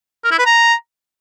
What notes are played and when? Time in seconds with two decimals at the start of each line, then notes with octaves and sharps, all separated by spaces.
0.24 A#4
0.31 E4
0.39 B4
0.46 A#5